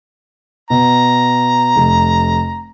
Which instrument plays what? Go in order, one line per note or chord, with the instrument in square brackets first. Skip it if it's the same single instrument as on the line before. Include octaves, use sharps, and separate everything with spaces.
[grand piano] B2 [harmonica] A#5
[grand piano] F1